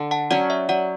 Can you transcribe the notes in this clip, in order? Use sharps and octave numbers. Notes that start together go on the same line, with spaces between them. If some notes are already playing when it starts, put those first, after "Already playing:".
Already playing: D3
F#5 A5
F#3 C#4 D5 F#5
C#5 E5
F#3 D5 F#5